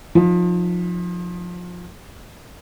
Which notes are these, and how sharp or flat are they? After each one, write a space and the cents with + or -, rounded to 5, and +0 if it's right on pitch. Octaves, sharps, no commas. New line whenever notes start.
F3 +25 D#4 +20